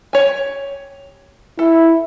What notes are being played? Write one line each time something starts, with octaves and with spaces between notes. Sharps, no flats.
G4 C#5 G#5
E4 A4